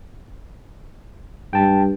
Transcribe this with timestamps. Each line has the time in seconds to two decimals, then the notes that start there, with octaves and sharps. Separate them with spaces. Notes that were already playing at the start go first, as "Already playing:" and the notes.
1.53 G2 G5 A5